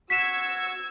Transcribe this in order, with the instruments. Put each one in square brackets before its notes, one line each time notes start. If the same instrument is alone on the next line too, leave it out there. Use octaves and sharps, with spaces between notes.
[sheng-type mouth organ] F#4 C#6 [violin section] E6 G#6 [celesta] B6 E7